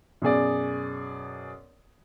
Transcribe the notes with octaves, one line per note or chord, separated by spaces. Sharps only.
F#2 B2 G#4 D5